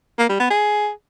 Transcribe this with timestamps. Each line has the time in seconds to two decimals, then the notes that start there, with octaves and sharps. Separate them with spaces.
0.19 A#3
0.29 G3
0.40 B3
0.50 G#4